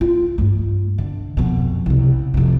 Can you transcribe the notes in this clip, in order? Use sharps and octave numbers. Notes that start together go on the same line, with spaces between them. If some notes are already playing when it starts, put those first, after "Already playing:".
F4
G2 A3
D3
F2 B2
C2 C#3
F2 C3